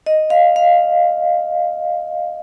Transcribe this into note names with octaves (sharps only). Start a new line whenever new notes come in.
D#5
F5
F5